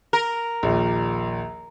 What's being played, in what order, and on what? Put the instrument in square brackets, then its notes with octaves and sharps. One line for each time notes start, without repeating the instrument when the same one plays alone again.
[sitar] A#4
[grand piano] A#1 D#2 A#2